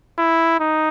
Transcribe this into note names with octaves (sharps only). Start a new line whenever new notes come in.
E4
D#4